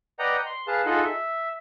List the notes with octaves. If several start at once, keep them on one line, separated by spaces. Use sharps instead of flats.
B4 D5 D#5 F#5 G5 A#5
C6
G#4 B4 F5 A5
D#4 F4 G#4 A4 D#5 F#5
E5